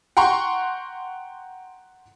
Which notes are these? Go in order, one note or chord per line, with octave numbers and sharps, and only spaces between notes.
F#5 G5 A#5 C6 C#6